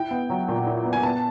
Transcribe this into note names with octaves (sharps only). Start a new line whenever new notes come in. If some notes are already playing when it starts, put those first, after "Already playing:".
Already playing: E4 G5
B3
F#3
A#2
E4
B3
G#5
B3 A5